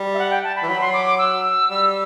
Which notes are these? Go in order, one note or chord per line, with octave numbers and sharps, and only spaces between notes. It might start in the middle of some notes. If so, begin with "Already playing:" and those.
Already playing: G3
E5
F#5
G5
A5
B5
E3
F#3 B5
C6
D6
D6
E6
G3